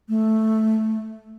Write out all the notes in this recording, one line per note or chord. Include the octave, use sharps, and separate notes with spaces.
A3